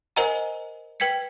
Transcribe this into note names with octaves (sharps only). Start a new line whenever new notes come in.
A#4 C5 D#5 F#5 G#5 A#5
B4 G5 G#6 B6 C#7